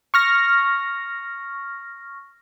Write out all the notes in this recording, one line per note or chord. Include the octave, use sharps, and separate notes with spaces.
C#6 F6 A#6